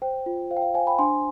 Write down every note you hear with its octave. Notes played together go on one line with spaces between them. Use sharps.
C5 G5
F4
C5 F5
G5
F5
C5 F5 G#5
G5 B5
D4 G#5 C6